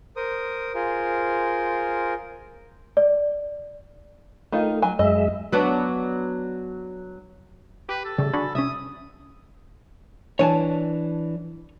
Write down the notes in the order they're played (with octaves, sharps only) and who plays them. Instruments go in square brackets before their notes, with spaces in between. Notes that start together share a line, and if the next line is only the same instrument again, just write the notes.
[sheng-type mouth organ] A#4 C5 D#6
F4 G#4 A#4 C5
[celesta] D5
[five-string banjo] D#3 D#4 F4 [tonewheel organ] A3
[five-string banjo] F#3 G#5
[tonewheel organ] F#2 G#3 E5 [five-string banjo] D#5
[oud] F#3 B3 D4
[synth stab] G4 [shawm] B4
[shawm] A4
[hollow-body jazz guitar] C#3 [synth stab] G3 A3
[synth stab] D4 F#4 G#4 [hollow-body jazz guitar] B5
[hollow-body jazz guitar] C2 C#4 [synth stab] E5 [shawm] D#6
[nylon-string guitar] E3 D4 [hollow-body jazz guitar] C#5 G#5 A5